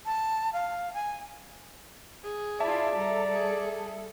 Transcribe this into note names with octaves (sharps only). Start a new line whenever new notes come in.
A5
F5
G#5
G#4
E4 F4 D5 E5 A5
G3 A4 A#5
G#4